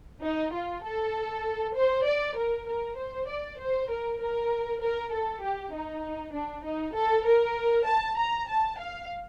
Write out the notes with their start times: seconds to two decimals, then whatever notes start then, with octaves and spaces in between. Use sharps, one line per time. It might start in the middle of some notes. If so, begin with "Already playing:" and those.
0.22 D#4
0.53 F4
0.84 A4
1.75 C5
2.06 D5
2.36 A#4
2.67 A#4
2.98 C5
3.28 D5
3.59 C5
3.90 A#4
4.20 A#4
4.81 A#4
5.12 A4
5.42 G4
5.73 D#4
6.34 D4
6.65 D#4
6.95 A4
7.26 A#4
7.87 A5
8.17 A#5
8.48 A5
8.79 F5